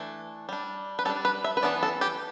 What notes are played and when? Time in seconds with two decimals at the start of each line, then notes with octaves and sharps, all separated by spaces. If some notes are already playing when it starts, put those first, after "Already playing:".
Already playing: E3 A3 D4
0.49 G3 D4
0.99 B4
1.05 G3 A4
1.10 D4
1.25 B4
1.44 E5
1.57 B4
1.63 E3 B3 D4 D5
1.83 A4
2.01 G4